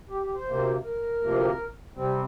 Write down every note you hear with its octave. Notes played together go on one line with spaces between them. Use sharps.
G4
G4
C5
D2 C3 A#3
A#4
D2 C3 F3 A#3
C3 G3 C4